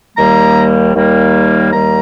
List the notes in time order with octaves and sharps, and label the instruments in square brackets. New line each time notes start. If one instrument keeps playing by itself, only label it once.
[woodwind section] D#2 D#3 G3 A#3 A#5
D#2 D#3 G3 A#3
D#2 D#3 G3 A#3 A#5